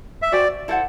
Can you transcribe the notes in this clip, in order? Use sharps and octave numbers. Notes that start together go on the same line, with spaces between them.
E5
F#4 C5 D5 G5
E4 A4 C5 F#5